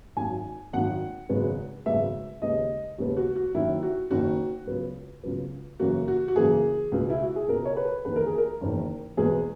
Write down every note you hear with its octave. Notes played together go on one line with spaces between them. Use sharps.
G#1 F#2 D#3 G#5
G#1 F#2 D#3 F#5
G#1 F#2 C#3 G#3 B3
G#1 F#2 C#3 G#3 B3 E5
D#2 C#3 G#3 B3 D#5
D#2 C#3 G#3 B3
F#4
F#4
F#1 F#2 D#3 E4
F#4
F#1 F#2 D#3 F#4
C#2 C#3 F#3 B3
C#2 C#3 F#3 B3
F#2 C#3 E3 A#3 F#4
F#4
F#4
F#2 C#3 E3 A#3 G#4
C#2 B2 G#3 B3
E4
F#4
G#4
C#2 B2 G#3 B3 A#4
C#5
B4
F#1 E2 D#3 B4
A#4
G#4
A#4
F#1 E2 D#3
E2 B2 G#3 B3 G#4